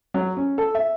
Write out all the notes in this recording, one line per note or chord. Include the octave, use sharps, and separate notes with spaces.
F#3
C#4
A4
E5